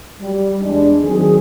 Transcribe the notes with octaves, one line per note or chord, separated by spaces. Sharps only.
G3
E2 G#3 D4
D#3 F#3 C4 G#4